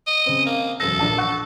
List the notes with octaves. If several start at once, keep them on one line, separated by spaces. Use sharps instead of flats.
D#5
C#3 C4
A#3
E1 F#2 A4 A#6
A#1 D4 A5
F#5 C#6 F#6